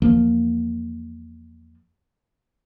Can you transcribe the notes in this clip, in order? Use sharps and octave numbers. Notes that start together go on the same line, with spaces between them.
E2 F3 A#3